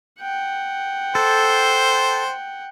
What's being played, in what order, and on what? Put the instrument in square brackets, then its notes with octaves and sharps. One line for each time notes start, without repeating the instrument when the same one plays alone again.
[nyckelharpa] F#5 G5
[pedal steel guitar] A4 [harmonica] C5